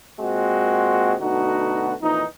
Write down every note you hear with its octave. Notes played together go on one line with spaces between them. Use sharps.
A#2 G#3 C4 F#4
B2 D3 A3 D#4 F#4
F2 A#2 E3 D#4